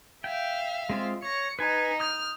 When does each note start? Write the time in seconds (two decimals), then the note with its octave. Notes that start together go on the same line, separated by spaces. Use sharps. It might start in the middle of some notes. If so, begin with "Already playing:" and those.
0.24 E5 F5 G5
0.90 G#3 C4 F4
1.22 C#5 A#6 C#7
1.59 D#4 B4 G#5
2.00 D#6 F6 G6